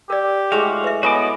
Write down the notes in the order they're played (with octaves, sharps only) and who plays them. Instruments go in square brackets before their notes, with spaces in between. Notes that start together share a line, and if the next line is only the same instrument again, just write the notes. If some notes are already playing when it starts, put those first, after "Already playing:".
[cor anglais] G4 [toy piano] A#4 D5
[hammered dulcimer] A2 G#3 [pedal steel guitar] F#4 F5 [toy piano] G#4
[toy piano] B4 E5
[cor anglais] B3 [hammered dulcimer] E4 [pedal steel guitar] F#4 D#5 D6 [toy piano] C#5 G#5 B5